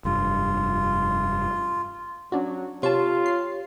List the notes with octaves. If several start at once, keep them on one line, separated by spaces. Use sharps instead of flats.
F1 G2 F4
F#3 C#4 D4 F#4
C3 F4 G4 C#5 A5 C6
C7